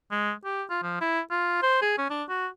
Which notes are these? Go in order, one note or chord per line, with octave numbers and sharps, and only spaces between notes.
G#3
G4
F4
F3
E4
F4
C5
G#4
C#4
D4
F#4